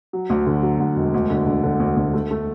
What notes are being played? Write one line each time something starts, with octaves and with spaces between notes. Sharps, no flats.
F#3
D2
D3
F#3
D2
E1
D2
D3
D3
D3
D2
D2
A3
A3